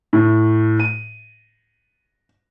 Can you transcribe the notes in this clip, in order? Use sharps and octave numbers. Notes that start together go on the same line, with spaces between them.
A2
D#7